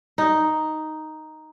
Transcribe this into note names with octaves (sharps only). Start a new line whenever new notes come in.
D#4